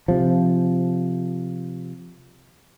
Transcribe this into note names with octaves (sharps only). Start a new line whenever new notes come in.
C3 F3